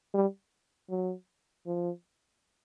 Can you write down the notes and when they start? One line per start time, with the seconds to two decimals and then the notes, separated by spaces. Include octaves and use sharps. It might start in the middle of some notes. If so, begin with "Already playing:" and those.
0.14 G3
0.90 F#3
1.67 F3